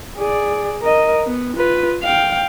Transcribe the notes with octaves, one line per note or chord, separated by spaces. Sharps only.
G#4 D5
A#4 D#5
B3
F4 B4
F5 G5